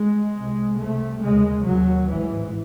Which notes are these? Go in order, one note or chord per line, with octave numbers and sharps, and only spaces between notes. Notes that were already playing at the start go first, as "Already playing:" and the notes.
Already playing: G#3
C2 C3
C2 C3 A3
D#2 C#3 G#3
D#2 C#3 F#3
A1 G#2 E3